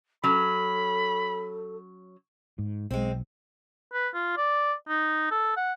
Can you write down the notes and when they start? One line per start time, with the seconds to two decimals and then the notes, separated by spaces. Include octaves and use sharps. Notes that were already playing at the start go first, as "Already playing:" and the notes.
0.24 F#3 C#4 A4 B5
2.59 G#2
2.91 B1 G#3 C4
3.93 B4
4.14 F4
4.37 D5
4.88 D#4
5.31 A4
5.57 F#5